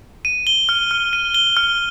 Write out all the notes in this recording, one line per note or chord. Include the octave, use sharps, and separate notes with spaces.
D#7
G7
F6
F6
D#7
G7
F6